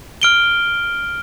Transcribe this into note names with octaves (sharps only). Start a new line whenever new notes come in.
F6 D7 G7